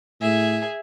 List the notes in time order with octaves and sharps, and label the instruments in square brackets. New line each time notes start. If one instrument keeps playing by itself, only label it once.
[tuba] A2 [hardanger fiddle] G#4 E5